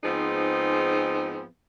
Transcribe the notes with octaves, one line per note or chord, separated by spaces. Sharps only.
G#2 F3 B3 C4 D#4 G#4